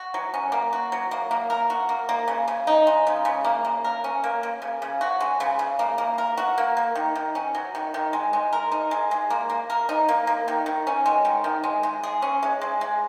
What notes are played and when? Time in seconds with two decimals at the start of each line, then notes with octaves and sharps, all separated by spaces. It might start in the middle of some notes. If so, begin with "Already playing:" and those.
Already playing: F#4
0.14 F#3
0.34 C#4
0.52 A#3
0.73 F#4
0.92 F#3
1.11 A#3
1.31 A#3
1.50 A#4
1.70 F#4
1.89 A#3
2.09 A#3
2.28 C#3
2.48 C#3
2.67 D#4
2.87 G#3
3.07 C#3
3.25 C#3
3.44 A#3
3.65 A#3
3.84 A#4
4.04 C#4
4.24 A#3
4.43 A#3
4.62 C#3
4.82 C#3
5.01 F#4
5.21 G#3
5.40 C#3
5.59 C#3
5.79 A#3
5.98 A#3
6.18 A#4
6.37 F#4
6.58 A#3
6.77 A#3
6.95 D#3
7.15 D#3
7.35 C#4
7.55 F#3
7.75 D#3
7.94 D#3
8.13 G#3
8.33 G#3
8.52 A#4
8.72 D#4
8.91 G#3
9.11 G#3
9.30 A#3
9.50 A#3
9.70 A#4
9.89 D#4
10.09 A#3
10.27 A#3
10.48 D#3
10.66 D#3
10.87 C#4
11.06 G#3
11.25 D#3
11.44 D#3
11.64 G#3
11.83 G#3
12.03 G#4
12.22 C#4
12.43 G#3
12.61 G#3
12.81 G#3